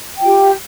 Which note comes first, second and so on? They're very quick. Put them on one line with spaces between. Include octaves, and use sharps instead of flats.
G5 F4 G4